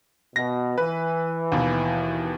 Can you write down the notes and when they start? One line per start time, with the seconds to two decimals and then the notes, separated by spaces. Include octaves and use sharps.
0.36 B2 A#6
0.78 E3 B4
1.52 D#2 B2